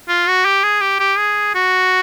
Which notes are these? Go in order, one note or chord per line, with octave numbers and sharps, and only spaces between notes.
F4
F#4
G4
G#4
G4
G4
G#4
F#4